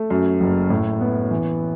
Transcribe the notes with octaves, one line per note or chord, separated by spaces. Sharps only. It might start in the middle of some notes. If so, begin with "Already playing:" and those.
Already playing: A3
F#2
F#1
A2
B3
E3